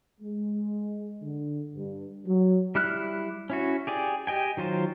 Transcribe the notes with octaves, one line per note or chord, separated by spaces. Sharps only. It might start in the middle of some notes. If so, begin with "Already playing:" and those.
G#3
D3
G2
F#3
G3 E4 F6 F#6
C#4 E4 F#4
G4 G#4 D5
G4 D#5 G5 G#5
D#3 F#3 F4 C5